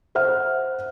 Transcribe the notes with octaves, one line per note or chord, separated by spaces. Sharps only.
C5 E5 F#5 F6